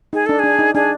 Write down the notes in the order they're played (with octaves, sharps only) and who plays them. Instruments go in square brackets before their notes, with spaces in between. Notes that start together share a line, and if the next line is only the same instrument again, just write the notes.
[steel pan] D#4 [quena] G#4
[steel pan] D4 [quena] A4
[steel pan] D4 [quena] G#4
[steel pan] D#4
[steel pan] D4 [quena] G#4